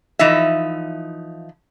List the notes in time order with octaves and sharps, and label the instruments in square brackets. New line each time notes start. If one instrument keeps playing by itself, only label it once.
[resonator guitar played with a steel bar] E3 F3 D#4 E5